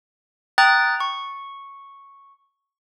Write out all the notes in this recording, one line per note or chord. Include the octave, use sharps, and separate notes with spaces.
G5 A#5 D#6 F#6 A6
C#6